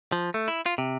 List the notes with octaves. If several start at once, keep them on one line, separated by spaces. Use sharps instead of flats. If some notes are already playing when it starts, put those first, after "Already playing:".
F3
A3
E4
F4
C3